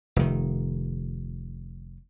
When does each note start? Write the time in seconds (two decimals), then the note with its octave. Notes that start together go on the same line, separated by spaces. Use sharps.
0.16 F1 D#3